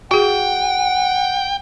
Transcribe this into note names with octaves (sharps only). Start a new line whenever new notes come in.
F#4 G#4 F#5 G5